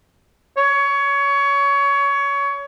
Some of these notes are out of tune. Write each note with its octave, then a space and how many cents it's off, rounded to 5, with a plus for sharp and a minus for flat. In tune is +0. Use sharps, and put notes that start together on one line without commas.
C#5 +20